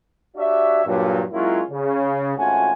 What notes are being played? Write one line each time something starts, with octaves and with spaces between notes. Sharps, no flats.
D4 F#4 G4 C#5 D5 E5
G2 A#2 F#3
F#3 G#3 A#3 C#4 E4 F4
C#3
G#1 A3 C#4 F4 F#4 G#5